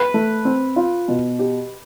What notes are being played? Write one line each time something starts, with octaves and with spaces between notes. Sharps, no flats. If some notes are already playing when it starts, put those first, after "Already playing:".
Already playing: B4
A3
C4
F4
B2
G4